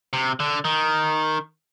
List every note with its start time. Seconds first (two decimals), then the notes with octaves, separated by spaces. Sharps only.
0.13 C3
0.40 D3
0.65 D#3